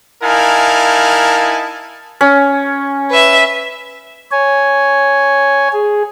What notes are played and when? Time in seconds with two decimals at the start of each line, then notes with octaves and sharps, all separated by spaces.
0.23 D#4 E4 A#4 F5 G#5 A5
2.21 C#4
3.09 B4 E5
4.32 C#5 G#5
5.73 G#4